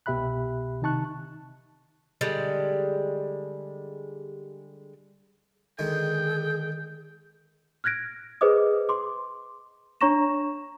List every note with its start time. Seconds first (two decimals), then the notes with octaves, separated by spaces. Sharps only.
0.06 C2 B2 G4 E5 B5 F#6
0.82 C3 D#3 D#4 A5 C#6 F#6
2.21 D3 G3 G#3
5.79 D3 D#3 G#3 G#4 G5
7.84 F6 F#6 G#6 A#6 D7
8.41 G#4 B4 C5 D#5 D6 D#6
8.89 C6 D6
10.01 D4 C#5 A#5 C#6 A#6 E7